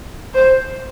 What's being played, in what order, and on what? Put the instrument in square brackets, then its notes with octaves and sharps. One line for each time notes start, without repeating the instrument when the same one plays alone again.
[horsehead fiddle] C5